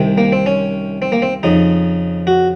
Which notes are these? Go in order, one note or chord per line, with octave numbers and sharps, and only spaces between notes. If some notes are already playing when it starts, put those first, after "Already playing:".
Already playing: C2 C3 D#3
A#3
C4
C#4
C4
A#3
C4
F2 C#3 D#4
F#4